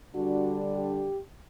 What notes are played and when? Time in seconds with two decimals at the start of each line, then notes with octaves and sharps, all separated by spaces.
0.14 D3 G3 D4 F#4
0.75 G4